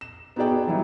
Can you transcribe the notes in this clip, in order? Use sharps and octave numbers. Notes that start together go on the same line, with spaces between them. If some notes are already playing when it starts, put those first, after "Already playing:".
E7
B3 D#4 F#4 G#4 D5 G5
E3 F#3 G3 D#4 E4